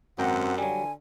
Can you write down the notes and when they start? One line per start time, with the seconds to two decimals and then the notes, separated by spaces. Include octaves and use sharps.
0.19 G#1 F#2 C4 F#5 G5 A#5
0.58 D3 F#3 G3 G#5